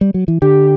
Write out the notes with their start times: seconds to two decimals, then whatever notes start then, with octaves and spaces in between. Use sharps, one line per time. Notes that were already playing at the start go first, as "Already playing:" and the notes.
0.01 G3
0.14 F#3
0.28 E3
0.42 D3 G4